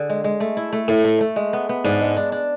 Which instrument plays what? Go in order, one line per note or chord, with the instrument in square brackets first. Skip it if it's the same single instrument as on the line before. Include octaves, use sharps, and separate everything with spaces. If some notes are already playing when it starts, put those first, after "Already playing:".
Already playing: [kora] D3 G#4
G#3
G#3
A3
E4
A3
[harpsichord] A2 [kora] A4
[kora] A3
A3
G#3
B3
B3
[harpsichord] G#2 [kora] D4
[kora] G#3
D4
D4